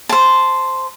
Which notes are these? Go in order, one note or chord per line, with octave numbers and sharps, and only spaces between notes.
C5 A5